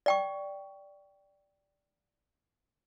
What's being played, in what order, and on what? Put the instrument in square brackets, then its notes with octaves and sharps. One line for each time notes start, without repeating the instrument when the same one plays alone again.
[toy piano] D5 G5 C#6